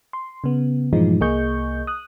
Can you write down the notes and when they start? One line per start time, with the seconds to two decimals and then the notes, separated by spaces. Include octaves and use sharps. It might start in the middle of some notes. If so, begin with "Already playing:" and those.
0.13 C6
0.44 C#3 B3
0.93 G2 A#2 E3 F3 G#3 D#4
1.20 C2 A#3 G#4 D#5 C#6 G6
1.87 D#6 F#6